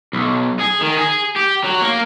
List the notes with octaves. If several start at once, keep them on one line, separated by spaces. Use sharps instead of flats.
B1
G#4
D#3
G#4
G4
F#3
A#3